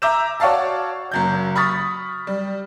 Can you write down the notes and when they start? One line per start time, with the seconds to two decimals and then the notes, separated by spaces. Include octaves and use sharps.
0.02 E5 A#5 D6 E6 G6 E7
0.40 F#4 C#5 D5 F5 A5
1.11 F#1 F#3 G6
1.55 B5 C#6 D#6 F6 A6 B6
2.27 G3